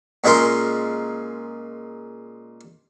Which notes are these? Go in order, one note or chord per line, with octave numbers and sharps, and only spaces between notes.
A#2 G#3 C#4 A#4 C6